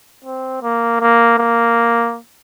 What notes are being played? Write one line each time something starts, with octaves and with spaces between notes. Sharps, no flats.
C4
A#3
A#3
A#3